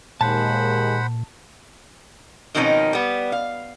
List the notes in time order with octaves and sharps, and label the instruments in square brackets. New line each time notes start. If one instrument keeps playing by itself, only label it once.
[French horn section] D#2 G#3 [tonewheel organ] A#2 [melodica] C5 F#5 B5 [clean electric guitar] A5
[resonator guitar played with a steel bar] B2 D#3 F3 C4 C#4 D#4
G3 B3
F5